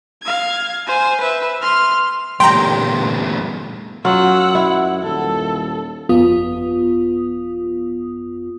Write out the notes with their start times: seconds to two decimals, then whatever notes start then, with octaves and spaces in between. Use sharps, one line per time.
0.23 F5 G#6
0.87 C5 G#5
1.20 B4 E5
1.62 C6 F6
2.40 G1 E2 A#2 G3 A3 G5 A#5 C6
4.05 F#2 F#3 F4 F#5 E6
4.55 E4
5.03 D#1 A4
6.09 G1 F2 B3 F4 D#6